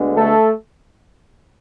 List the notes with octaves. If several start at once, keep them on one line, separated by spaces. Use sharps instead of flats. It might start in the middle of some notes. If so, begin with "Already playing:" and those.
Already playing: D2 D3 G#3 B3
A3 A4